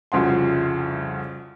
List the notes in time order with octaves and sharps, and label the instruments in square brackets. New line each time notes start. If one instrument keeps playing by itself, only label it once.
[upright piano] C2 F2 C#3 F#4 C6